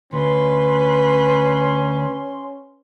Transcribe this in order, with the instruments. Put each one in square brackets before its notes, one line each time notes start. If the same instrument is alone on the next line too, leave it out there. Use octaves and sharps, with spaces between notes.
[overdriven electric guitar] D2 [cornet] C#4 [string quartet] B4 [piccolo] C6